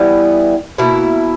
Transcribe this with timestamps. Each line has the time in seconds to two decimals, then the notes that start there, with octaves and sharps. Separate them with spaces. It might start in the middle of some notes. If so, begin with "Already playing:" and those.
Already playing: E3 G3 B3 E4
0.78 B2 A#3 E4